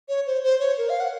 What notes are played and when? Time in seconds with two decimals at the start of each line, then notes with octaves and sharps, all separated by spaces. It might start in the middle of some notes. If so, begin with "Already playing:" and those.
0.09 C#5
0.27 C5
0.43 C5
0.60 C#5
0.78 A#4
0.89 F5
1.00 F#5